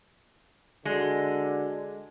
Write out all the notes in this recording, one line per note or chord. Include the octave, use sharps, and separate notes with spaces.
D3 G#3 F#4 D5 D#5